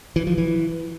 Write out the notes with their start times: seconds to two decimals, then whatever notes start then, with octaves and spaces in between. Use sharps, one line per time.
0.16 E3
0.27 F3
0.38 E3